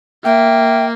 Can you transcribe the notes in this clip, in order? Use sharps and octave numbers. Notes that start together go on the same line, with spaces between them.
A#3 E5 G5